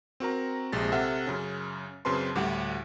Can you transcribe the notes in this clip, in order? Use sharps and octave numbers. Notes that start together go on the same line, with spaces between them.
C4 F#4 A#4 A#5
A#1 C3 G#3 A6
C3 A4 E5 F#5 F6
F#2 C#3 C#4
F#2 C#3 C4 B4 A5 C6
D2 A2 G3 G4 F#5